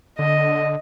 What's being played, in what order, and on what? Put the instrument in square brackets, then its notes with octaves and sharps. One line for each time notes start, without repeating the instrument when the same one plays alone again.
[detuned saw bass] D3 [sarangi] D#5